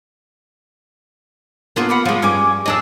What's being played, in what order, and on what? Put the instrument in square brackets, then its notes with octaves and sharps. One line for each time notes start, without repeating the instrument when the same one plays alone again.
[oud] A#3 B3 F4 [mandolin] D4 G#4 F#5
[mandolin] F#5 B5 D6
[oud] F3 G#3 [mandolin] F4
[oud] G2 [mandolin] C#4 G#5 D6
[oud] F2 D4 D#5 [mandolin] G#4 A5 E6